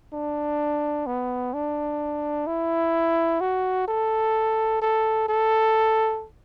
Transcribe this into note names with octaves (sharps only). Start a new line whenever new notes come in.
D4
B3
D4
E4
F#4
A4
A4
A4